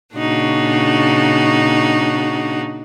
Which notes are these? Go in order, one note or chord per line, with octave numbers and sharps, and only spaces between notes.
A#2 C#3 D4 D#4 F#4